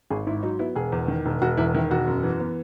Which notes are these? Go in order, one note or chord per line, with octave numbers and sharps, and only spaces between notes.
G#1 G#4
G#2 E4
F#3 D#4
B3 E4
E1 G#4
E2
D#3
E1
E1 F#4
E2 E4
D#3 E4
E1 F#4
F#2
E3
B3